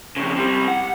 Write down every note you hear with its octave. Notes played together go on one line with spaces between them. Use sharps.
F2 C#3
C3 G3
F#5